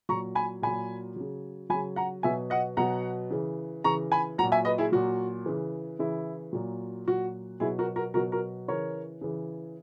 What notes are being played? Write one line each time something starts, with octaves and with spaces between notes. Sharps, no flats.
A#2 F#3 A#5 C#6
G#5 B5
A#2 F#3 G#5 B5
C#3 F#3
C#3 F#3 G#5 B5
F#5 A#5
B2 F#3 E5 G#5
D#5 F#5
B2 F#3 F#5 A#5
C#3 E3
C#3 E3 A#5 C#6
G#5 B5
A#2 F#3 F#5 A#5
E5 G#5
B4 D#5
E4 G#4
A#2 F#3 F#4
C#3 E3
C#3 E3 E4
A#2 F#3
A#2 F#3 F#4
B2 F#3 E4 G#4
F#4 A#4
F#4 A#4
B2 F#3 F#4 A#4
F#4 A#4
C#3 E3 A#4 C#5
C#3 E3